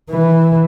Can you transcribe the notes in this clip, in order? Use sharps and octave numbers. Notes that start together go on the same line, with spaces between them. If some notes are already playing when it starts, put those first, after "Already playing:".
E3